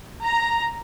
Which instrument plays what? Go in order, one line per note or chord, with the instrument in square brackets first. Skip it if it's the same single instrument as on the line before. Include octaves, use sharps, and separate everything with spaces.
[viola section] A#5